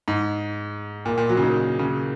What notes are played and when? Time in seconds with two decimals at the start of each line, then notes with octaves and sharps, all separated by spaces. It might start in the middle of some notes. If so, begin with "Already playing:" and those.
0.08 G#2
1.05 A#2
1.18 A#2
1.29 F#3
1.37 C#3
1.42 D#3
1.79 C#3